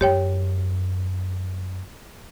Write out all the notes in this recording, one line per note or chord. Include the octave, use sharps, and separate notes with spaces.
F#2 G4 C#5 G5